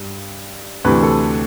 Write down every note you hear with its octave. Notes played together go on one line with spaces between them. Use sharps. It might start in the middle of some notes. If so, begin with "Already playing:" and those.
Already playing: G2
D2 C3 E3 B4
A4